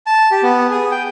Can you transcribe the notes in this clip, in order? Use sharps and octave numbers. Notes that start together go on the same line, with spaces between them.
A5
G4
B3
G#4
G5